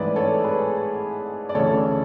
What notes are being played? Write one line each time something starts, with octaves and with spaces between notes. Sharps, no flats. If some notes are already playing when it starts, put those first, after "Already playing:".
Already playing: A1 G#2 E3 B4 D5
A4 C#5
G#4 B4
D5
D2 C#3 E3 A4 C#5